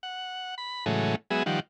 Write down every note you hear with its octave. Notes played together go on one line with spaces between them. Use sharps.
F#5
B5
A2 C#3 E3 F#3 G#3 A3
F#3 G#3 B3 G#4 E5
D#3 F3 G3 F#5